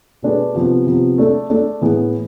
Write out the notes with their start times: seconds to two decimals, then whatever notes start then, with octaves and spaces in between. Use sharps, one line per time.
0.23 B2 A3 D4 G#4 B4
0.55 C3 F3 B3
0.86 C3 F3 B3
1.18 A3 D4 A4
1.50 A3 D4 A4
1.81 A2 E3 B3 E4 G#4